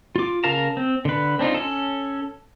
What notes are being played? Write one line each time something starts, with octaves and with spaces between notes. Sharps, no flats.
F4 D6
C#3 A#4 F5 A5 A#5
C4
D3 B4
C4 D4 D#4 F4
C#4 A4